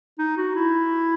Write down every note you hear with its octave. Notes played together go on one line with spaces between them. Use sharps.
D#4
F#4
E4